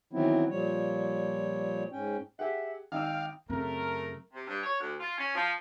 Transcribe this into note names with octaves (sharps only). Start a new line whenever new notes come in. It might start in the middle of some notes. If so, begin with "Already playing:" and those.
D#3 E3 F#3 B3 C4 E4
A#2 F3 G3 C#5
G#2 C#4 G5
G4 G#4 E5 F#5
G#1 D#4 F5 G5 E6
F#2 C#3 A3 C4 A#4
C3
G2
C#5
D2
F4
C#4
F3